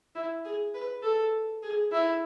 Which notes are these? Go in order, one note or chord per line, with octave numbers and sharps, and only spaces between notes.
E4
G#4
B4
A4
G#4
E4